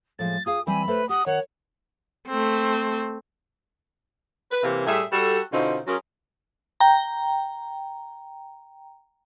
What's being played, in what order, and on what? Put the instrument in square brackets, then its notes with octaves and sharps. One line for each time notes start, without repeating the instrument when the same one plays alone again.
[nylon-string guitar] A2 F3 G#3 [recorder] A6
[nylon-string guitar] F4 G#4 F5 [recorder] D#6
[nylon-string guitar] E3 G3 C4 [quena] G#5 [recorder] B5
[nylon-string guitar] A3 A4 C5 [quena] B4
[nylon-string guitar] G4 [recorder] F#5 [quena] D#6
[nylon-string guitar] D#3 [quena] C#5 [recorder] F#5
[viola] A3 C4
[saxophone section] B4
C3 E3 A#3
A2 G3 G#4 E5
G3 F#4 A4
B2 D3 C4 C#4 D#4 F4
F#3 C#4 F4 G#4 A#4
[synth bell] G5 A#5